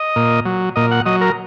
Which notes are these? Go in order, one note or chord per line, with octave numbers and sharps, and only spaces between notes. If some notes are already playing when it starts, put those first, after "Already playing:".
Already playing: D#5
A#2
F#3
A#2 D#5
F#5
F#3 D#5
A#4